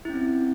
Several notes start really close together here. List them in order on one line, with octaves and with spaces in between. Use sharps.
E4 C#4 C4